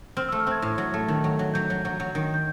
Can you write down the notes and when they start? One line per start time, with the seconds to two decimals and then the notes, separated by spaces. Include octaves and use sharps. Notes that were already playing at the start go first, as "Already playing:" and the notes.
0.17 C4 F6
0.29 A3 E6
0.40 F6
0.47 C4 G#6
0.62 A2
0.78 F#3
0.94 A3
1.08 D#3
1.24 F#3
1.39 F#3
1.54 F#3 G6
1.70 F#3
1.85 F#3
2.00 F#3
2.15 D#3
2.34 G6